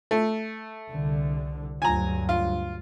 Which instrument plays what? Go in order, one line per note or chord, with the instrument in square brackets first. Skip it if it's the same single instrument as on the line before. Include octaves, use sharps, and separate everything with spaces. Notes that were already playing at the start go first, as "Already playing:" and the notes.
[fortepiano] A3
[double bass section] C2 D3
[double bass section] D2 G2 F#3 [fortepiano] G#5 A#5
[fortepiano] F4